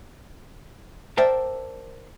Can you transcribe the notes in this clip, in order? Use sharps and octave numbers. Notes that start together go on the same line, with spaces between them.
A#4 C5 D5 E5 G5 A5